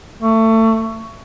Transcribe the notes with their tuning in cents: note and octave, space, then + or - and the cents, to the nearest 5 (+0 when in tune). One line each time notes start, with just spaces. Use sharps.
A3 +25